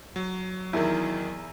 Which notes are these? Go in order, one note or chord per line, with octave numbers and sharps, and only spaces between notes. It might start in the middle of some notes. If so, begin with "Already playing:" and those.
F#3
E2 D#3 F#3 E4 A#4